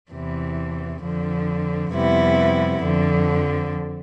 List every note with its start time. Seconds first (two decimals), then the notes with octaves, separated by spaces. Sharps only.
0.11 E2 C3 E3
1.02 F2 D3 F3
1.92 F2 C3 G3 B3 E4
2.83 F2 D3 F3